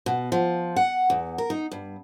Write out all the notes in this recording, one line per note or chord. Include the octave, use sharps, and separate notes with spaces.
B2
F3
F#5
E2
A#4
D#4
G2